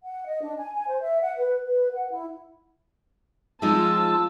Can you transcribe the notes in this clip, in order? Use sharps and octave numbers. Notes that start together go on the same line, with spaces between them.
F#5
D#5
D4
G#5
G#5
C5
E5
F#5
B4
B4
F#5
E4
F3 G#3 C4 D#4 F4 A5 E6